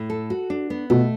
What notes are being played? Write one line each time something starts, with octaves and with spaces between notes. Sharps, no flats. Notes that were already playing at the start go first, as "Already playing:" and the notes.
Already playing: A2
A4
F#4
D4
B3
B2 A3